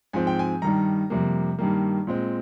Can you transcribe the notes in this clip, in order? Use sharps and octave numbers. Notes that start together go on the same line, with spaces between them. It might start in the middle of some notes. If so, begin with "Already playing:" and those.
G#2 F3 C4 G#5
G5
G#5
G2 D#3 G3 A#5
F2 C3 G3 A#3
G2 D#3 G3 A#3
A#2 G#3 C4